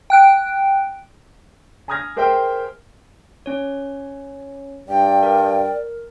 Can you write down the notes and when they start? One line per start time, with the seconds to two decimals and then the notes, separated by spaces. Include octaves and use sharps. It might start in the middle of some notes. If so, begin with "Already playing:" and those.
0.10 G5 F#6 D7
1.88 G#5 A#5 D#6 F6 G#6 A#6
2.17 G#4 A#4 C5 E5 G5
3.46 C#4 C#5
4.88 G2 D5 G5
5.23 A#4